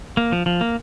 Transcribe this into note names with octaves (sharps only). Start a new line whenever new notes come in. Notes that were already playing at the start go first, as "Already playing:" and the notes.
A#3
F3
F3
A#3